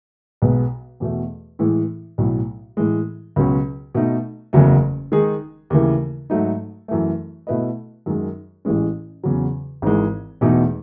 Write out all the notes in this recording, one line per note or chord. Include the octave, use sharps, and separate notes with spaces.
B1 B2 G#3 B3
E2 B2 A3
A2 E3 G#3
B1 A2 F#3
A2 E3 G#3
C#2 B2 F#3 C#4
B2 A3 D#4
F#1 E2 C#3 F#3 A3
D#3 G#3 D#4 G#4
D#2 C#3 E3 A3
G#2 F#3 A3 D#4
F#2 E3 A3
B2 A3 E4 B4 D#5
F#2 D#3 G#3
A1 A2 E3 G#3 C#4
E2 C#3 F#3
G#1 G#2 E3 G#3
E1 E2 B2 A3 D#4